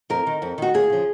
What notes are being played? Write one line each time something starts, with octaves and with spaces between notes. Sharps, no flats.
F2 A#4
D#3
F2
D#3 F#4
D#2 G#4
C#3 F3